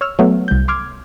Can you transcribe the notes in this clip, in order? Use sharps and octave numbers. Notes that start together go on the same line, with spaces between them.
C#5 E6 F6
F#3 A3 B3
C2 G6
C6 D6 F6 G#6